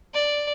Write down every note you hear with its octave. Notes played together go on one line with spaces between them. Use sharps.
D5